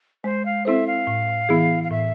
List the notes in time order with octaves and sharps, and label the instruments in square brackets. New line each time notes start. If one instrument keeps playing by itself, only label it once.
[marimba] G#3 [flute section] C5
[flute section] F5
[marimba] C4 E4 A4 C5 [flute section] E5
[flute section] F5
[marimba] A2
E3 B3 E4 G#4
[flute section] F5
[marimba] A2 [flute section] E5